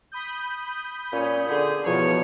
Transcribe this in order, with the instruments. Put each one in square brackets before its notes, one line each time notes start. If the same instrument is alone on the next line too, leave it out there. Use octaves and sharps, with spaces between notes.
[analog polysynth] B5 D#6 G6
[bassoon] A#2 [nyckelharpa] C#4
[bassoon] D3 [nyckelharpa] G#4
[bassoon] E2 [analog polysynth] B2 F3 [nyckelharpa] C#5